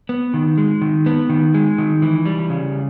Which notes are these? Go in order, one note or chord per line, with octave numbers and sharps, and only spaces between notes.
B3
D#3
G#3
D#3
B3
D#3
G#3
D#3
E3
G3
C#3